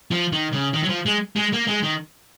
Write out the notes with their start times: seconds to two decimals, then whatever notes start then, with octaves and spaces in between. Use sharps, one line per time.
0.11 F3
0.33 D#3
0.53 C#3
0.74 D#3
0.83 F#3
0.89 F3
1.06 G#3
1.36 G#3
1.53 A#3
1.67 G#3
1.83 D#3